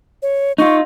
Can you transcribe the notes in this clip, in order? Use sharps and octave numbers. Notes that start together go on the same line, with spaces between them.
C#5
D#4 F4 C#6